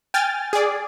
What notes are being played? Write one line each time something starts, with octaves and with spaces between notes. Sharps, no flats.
G5 G#5 F6 A6
G#4 D5